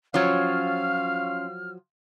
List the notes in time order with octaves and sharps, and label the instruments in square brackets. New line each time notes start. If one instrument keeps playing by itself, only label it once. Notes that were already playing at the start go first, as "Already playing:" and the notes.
[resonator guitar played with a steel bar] F3 F#3 [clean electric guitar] C#4 F4 C#5 [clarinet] F5 [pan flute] F6